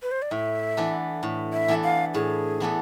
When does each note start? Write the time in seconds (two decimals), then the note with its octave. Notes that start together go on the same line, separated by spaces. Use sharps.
0.02 B4
0.11 C5
0.22 D5
0.31 A2 E5
0.77 E3 B3 D4 A4
1.23 A2
1.53 E5
1.68 E3 B3 D4 A4
1.84 F5
2.14 A2 G#4
2.60 E3 B3 D4 A4